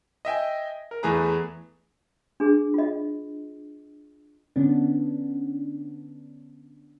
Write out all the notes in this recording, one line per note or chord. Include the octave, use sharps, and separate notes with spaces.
D#5 E5 G5 G#5
A#4
E2 E3 A3 G#4 B4 A#5
D4 G#4
F4 D#5
D3 B3 C#4 D4